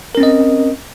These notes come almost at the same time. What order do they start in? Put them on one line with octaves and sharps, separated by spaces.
A#4 C#4 C4 D#5